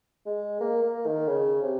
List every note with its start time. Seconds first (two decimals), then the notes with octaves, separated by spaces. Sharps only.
0.26 G#3
0.61 A#3
0.83 A#3
1.06 D#3
1.28 C#3
1.63 C3